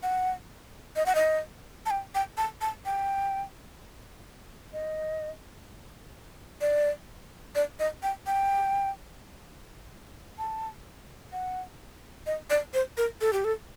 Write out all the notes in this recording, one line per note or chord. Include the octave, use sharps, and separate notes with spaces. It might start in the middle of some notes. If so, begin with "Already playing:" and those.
F#5
D#5
F#5
D#5
A5
G5
G5
A5
A5
G5
D#5
D5
D5
D#5
G5
G5
A5
F#5
D#5
D5
C5
A#4
A4
G4
A4